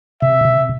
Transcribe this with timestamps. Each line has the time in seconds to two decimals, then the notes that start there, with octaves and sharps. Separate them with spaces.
0.22 C3 E5
0.45 C3